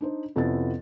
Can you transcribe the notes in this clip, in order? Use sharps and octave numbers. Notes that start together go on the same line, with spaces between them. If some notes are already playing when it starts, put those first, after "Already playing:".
D4 D#4 C5
F2 C3 B3 C#4 E4 A6